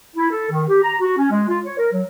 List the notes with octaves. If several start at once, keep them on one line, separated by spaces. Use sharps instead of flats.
E4
A4
D#3
G4
A#5
F#4
C#4
G#3
F4
C#5
A#4
F#3